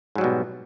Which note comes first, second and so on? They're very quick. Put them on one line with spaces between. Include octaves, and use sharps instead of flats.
G#2 F#3 G3 B2